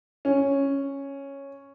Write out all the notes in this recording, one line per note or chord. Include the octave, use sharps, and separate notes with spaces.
C#4